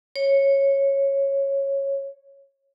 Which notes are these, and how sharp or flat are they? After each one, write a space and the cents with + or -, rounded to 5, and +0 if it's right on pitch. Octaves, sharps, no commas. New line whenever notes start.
C#5 -10